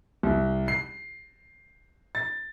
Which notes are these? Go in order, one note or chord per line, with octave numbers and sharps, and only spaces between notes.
C2
C7
A6